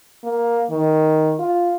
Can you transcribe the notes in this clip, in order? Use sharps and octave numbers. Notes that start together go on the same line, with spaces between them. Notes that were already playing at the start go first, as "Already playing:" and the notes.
A#3
D#3
F4